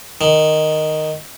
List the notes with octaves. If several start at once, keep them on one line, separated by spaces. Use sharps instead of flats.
D#3